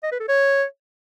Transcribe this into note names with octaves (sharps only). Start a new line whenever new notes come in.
D#5
B4
A4
C#5